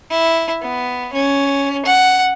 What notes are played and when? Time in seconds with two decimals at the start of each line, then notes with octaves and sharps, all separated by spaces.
0.11 E4
0.62 B3
1.13 C#4
1.86 F#5